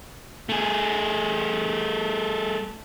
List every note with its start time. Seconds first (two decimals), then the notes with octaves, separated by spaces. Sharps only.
0.49 A3 G#4